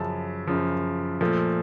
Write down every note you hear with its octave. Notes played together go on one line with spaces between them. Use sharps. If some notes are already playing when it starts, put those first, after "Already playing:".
Already playing: F#2 C#3 F3 A5
F#2 C#3 F3
A#2 F3 A3